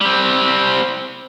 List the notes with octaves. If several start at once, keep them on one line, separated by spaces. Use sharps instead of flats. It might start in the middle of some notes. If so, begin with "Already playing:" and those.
G3 C4